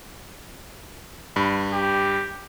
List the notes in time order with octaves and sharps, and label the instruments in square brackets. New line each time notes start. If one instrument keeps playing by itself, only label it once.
[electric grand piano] G2 B5
[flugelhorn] G4